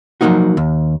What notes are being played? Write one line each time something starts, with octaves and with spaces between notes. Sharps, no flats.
F3 F#3 A3 A#3 D#4 F#4
D#2